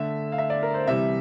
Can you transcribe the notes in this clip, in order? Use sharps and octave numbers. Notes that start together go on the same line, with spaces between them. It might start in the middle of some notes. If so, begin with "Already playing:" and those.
Already playing: D3 A3 E5
F5
E5
D5
A#4
C5
C3 E3 G3 E5